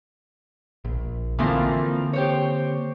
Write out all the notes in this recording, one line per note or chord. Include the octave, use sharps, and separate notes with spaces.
A#1
D3 E3 F3 A#3 C4 A#4
G4 C5 C#5